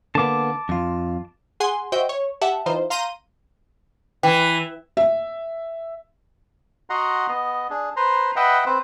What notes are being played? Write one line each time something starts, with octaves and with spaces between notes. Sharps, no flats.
D3 A#3 B3 A5 D6
F2 F4
G#4 F#5 G#5 C6
F#4 C5 D#5 E5 G5
C#5
G4 E5 F#5 A5
E3 D#4 F4 C5
F5 A#5 C6 G6 A#6 D#7
E3 G5
E5
F#4 D#5 F#5 A#5 C6
B3 D#5
D4 G#4
B4 C5 A#5 C6
B4 D#5 E5 F#5 G5
C4 B4 C5